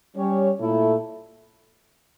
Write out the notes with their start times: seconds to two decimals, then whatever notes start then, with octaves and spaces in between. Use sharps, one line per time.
0.16 G3 C#4 G4 C#5
0.60 A#2 A3 E4 A4